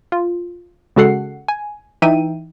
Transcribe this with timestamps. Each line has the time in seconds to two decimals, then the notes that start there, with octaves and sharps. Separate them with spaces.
0.12 F4
0.96 C#3 G#3 F#4 A4 F#5 C7
1.48 G#5
2.02 E3 D#4 E5 G5 D#7